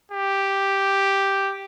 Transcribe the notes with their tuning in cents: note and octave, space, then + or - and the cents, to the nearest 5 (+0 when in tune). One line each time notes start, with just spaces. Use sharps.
G4 +0